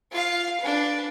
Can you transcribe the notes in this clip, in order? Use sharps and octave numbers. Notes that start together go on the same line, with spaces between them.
F4 F5
D4 B4